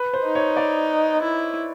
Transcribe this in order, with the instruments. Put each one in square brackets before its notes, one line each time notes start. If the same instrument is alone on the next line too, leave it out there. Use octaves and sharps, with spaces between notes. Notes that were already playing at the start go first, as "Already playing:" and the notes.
Already playing: [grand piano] B4
C5
[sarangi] D#4
[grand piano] C#5
D5
[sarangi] E4